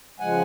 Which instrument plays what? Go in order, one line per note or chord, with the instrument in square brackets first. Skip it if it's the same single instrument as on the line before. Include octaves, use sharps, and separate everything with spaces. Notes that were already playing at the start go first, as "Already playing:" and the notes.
[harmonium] C#3 F3 G#3 F#5 G#5